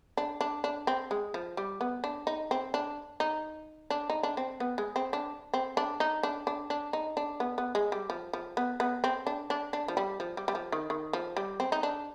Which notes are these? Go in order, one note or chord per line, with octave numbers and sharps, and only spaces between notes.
D4
D4
D4
C4
G#3
F3
G3
B3
D4
D#4
C4
D4
D#4
D4
D#4
D4
C4
B3
G#3
C4
D4
C4
D4
D#4
D4
D4
D4
D#4
D4
B3
B3
G#3
G3
F3
F3
B3
B3
C4
D4
D4
D4
F3
G3
F3
G3
G3
F3
D#3
D#3
F3
G3
C4
D#4
D4